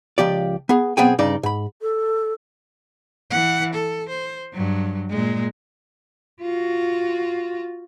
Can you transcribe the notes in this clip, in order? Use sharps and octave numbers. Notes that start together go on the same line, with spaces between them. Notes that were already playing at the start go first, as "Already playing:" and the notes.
C#2 F3 G4 D5
B3 G#4
B1 B3 C4 G#4 G5 G#5
G2 C#3 D#4 D5
G#2 B5
A4
E3 F#5
A4
C5
G2 F#3
A#2 G#3
F4 F#4